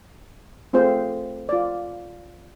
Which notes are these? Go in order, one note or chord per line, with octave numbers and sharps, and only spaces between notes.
A3 C4 F4 G#4 C5 F5
F4 D5